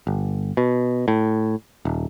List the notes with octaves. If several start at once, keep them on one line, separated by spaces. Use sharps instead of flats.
G1
B2
A2
D#1